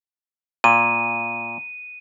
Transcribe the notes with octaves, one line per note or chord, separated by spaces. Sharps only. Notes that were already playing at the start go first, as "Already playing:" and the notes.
A#2 D#7